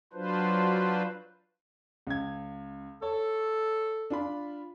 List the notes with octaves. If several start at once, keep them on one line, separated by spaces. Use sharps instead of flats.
F#3 D4 F4 B4 C5
C#2 G#6
A4 C#5
D4 F4 B5